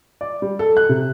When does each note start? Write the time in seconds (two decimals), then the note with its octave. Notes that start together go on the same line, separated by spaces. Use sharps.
0.21 D5
0.42 G3
0.59 A4
0.77 F#6
0.89 C3